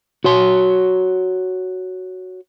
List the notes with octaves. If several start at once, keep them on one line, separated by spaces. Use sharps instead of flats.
F#4 C#5 C6